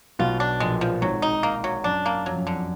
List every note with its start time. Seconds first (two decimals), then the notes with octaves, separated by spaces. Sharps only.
0.19 B1 B2 F4
0.40 D4
0.60 A#1 A#2 G#3
0.81 F3
1.02 G#1 G#2 F#3
1.22 D#4
1.43 A#3
1.64 F#3
1.84 F#2 D4
2.06 A#3
2.26 F2 F#3
2.36 F#2
2.45 F2 D3